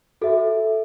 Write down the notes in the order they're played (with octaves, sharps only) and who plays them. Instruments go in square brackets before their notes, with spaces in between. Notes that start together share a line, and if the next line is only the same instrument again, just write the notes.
[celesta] F#4 A4 E5